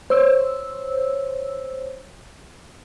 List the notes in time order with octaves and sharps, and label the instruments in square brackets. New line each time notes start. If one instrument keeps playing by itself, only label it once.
[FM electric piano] C5 C#5 E6